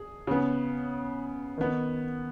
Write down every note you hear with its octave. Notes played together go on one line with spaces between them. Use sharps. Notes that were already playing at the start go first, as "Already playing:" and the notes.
Already playing: G#4
C#3 B3
D#3 B3